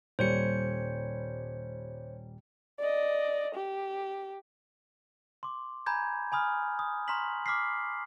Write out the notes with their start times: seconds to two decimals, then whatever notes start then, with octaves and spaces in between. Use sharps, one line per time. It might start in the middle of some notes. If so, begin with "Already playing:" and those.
0.19 D#1 G3 C5 C#5 C#7
2.79 D5 D#5
3.54 G4
5.43 C6 D6
5.86 G#5 A#5 B5 G6 G#6
6.32 G#5 B5 D#6 F6 G#6
6.79 D#6
7.08 A#5 C6 C#6 F6 B6 F#7
7.46 D6 F6 B6 C7